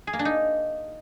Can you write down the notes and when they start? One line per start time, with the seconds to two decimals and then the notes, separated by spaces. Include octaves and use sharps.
0.07 G#4
0.13 A#3
0.19 D4
0.25 D#4